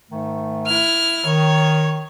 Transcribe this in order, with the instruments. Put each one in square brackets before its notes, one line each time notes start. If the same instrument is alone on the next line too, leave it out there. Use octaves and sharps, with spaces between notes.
[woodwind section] G#2 D#3 A3
[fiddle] E4 F6
[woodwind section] D#3 [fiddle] C#5